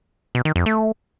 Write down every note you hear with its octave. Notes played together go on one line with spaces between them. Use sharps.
B2
D#3
F2
A3